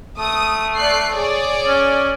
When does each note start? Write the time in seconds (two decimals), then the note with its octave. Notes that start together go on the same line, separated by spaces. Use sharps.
0.19 A3 D#6
0.76 D5 F#6 C7
1.14 G#4 C#5 D5
1.67 C#4